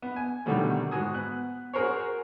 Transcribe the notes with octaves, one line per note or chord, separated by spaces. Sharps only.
B3
G#5
B2 D3 D#3 F#3 G3 A3
G#2 F#4 G#5 D#6
B3 F#6
F#4 G#4 A#4 C5 C#5